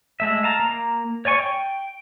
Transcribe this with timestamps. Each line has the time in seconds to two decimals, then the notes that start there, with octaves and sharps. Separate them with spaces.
0.20 G#3 A3 E5
0.43 F5 A5 A#5
0.59 A#3 A#5
1.25 C#5 D5 G#5 C#6
1.39 G5